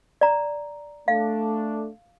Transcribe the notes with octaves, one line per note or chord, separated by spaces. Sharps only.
D5 A#5
A3 D4 F5